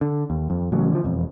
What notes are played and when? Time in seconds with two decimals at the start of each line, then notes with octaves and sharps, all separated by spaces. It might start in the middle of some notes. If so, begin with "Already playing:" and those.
0.01 D3
0.30 D#2
0.50 F2
0.72 A1 C#3 F#3
0.92 D3 E3 F3
1.04 E1 F2